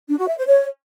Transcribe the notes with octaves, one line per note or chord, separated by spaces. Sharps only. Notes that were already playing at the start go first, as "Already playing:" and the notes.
D4
F#4
E5
C5
C#5